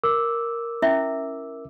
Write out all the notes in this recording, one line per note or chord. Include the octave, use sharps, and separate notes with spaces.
A#4 D6 E6
C#4 E4 E5